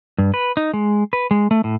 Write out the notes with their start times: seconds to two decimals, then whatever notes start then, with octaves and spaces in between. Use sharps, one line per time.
0.18 G2
0.34 B4
0.57 D#4
0.74 G#3
1.13 B4
1.31 G#3
1.51 A3
1.64 A2